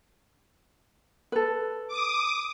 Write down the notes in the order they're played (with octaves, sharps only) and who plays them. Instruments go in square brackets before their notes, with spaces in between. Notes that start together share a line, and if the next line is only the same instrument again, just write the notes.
[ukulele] A4 B4
[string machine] D6 D#6